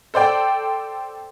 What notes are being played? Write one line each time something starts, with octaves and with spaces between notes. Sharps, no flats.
A4 C5 D5 G5